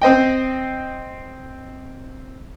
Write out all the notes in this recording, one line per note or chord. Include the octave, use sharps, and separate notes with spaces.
C4 C5 D#5 G5